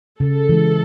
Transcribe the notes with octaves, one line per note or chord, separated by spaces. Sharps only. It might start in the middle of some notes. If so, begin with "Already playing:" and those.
C#3 A4
E3 G#3